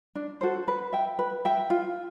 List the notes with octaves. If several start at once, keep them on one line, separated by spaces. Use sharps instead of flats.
D4
F#4 A4 C5
B4
E5 G5
B4
E5 G5
F4